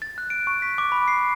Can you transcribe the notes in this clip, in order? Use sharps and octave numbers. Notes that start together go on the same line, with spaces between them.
A6
F#6
D7
C#6
B6
D6
B5
C7